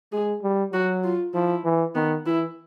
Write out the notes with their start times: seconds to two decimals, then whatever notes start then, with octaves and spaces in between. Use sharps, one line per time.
0.12 G#3 G#4
0.43 G3
0.73 F#3 F#4
1.04 F4
1.34 F3 E4
1.64 E3
1.95 D#3 B3
2.26 E3 E4